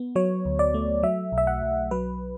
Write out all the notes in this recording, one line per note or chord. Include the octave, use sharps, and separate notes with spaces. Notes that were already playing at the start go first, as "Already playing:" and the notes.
Already playing: B3
F#3 C#5
D2
D5
A3
F#3 E5
B1
E5
F#5
B1
F#3 B4